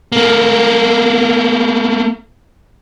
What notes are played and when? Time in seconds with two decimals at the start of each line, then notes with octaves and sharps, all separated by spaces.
0.12 A3 A#3